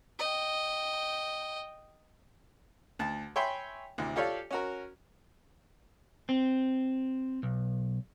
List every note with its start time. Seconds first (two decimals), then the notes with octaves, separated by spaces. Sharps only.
0.19 D#5 G5
2.99 D2 A5
3.36 C#5 E5 G5 G#5 B5 C6
3.98 D2 A2 C3
4.16 F4 G4 A4 C#5 D5 F5
4.51 C#4 F#4 A#4
6.29 C4
7.43 B1